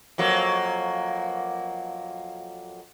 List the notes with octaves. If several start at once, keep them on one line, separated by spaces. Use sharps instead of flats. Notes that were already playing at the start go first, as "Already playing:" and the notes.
F2 F#3 A#3